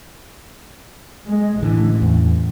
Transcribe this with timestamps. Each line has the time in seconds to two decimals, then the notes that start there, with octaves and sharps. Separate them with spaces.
1.28 G#3
1.63 A1 D3 E3
2.02 E2